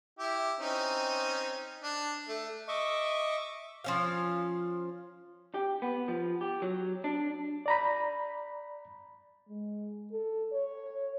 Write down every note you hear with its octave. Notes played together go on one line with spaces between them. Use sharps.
E4 G4
C4 C#4 D#4
D4
A3
D#5 E5 C#6 D6
F3 C#4 F5
G4
B3
F3
G4
F#3
D4
D5 A#5 B5
G#3
A4
C#5